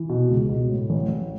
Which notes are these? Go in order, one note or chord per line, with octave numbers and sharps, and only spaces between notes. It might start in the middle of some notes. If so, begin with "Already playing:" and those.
Already playing: E3
B2
C#2
B2
A2
A1
A1